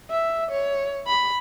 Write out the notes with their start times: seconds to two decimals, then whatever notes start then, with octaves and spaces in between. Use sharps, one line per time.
0.10 E5
0.51 C#5
1.07 B5